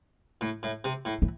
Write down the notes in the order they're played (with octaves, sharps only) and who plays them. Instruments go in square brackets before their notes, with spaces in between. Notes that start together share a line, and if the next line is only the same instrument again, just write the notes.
[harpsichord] A2
A2
C3
A2
[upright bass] E3